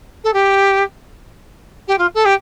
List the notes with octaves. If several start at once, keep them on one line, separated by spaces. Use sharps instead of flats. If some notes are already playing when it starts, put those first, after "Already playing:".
A4
G4
G4
F4
A4
G4